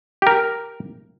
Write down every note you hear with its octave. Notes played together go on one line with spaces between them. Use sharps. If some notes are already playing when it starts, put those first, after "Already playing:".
G4 A#4